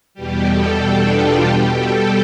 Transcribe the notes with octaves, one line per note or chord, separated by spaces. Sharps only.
E2 B2 G3 G4
A4
D4
F4
B2 G3 G4
A4